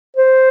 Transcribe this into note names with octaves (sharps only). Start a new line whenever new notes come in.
C5